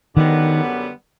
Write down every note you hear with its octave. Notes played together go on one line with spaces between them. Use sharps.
F#2 D3 D#3 G3 B3